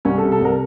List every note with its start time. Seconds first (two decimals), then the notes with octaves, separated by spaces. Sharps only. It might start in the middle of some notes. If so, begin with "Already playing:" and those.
0.05 C2 C#4
0.18 A4
0.22 C3
0.32 A4
0.40 C2 A#4